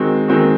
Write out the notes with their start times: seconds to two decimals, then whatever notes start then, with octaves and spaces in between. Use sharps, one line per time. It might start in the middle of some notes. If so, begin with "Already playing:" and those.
Already playing: D#3 G#3 C4 F#4
0.28 D#3 G#3 C4 F#4